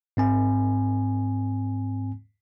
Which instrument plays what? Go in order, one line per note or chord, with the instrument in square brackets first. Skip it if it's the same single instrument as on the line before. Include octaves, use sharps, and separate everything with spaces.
[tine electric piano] G#2 C4 G#5